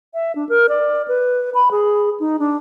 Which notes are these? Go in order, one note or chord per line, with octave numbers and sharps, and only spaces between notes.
E5
D4
A#4
D5
B4
B5
G#4
D#4
D4